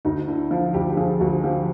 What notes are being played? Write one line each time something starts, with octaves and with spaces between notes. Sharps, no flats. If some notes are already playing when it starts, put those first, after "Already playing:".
D2 D#4
D3 E4
F3 F4
D2 G4
G4
F3 G#4
D2 F#4
F3 G4